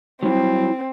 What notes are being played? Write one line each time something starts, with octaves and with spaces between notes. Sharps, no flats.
F#3 G3 C4 E4